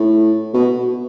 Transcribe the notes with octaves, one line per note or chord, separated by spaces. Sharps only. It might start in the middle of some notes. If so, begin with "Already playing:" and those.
Already playing: A2
B2